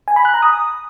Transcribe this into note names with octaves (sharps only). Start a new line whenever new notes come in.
G#5
B5
F#6
A#5
D#6